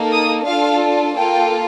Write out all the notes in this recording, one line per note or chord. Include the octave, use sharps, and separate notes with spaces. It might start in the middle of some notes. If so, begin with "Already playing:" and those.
Already playing: A#3 D#4 A4
D#6
D4 F4 A4 F5
A#3 F4 A4 G5